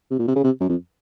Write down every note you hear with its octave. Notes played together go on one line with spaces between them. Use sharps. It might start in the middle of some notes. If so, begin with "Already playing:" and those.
C3
A#2
C3
C#3
C3
F#2
F2